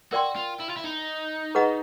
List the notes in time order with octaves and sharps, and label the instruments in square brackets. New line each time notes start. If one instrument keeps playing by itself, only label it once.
[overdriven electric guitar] F#4 [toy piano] A#4 D5 G5 C6
[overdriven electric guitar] F4
E4
F4
E4
D#4
[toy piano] G#4 B4 D#5 F#5 A#5